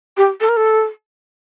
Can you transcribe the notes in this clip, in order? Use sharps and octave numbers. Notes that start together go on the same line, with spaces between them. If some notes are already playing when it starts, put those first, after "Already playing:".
G4
A4
A#4
A4